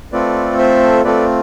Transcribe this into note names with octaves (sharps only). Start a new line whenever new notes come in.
A3 C4 F4 A4 B4 D5
C5 E5
A3 C4 F4 A4 B4 D5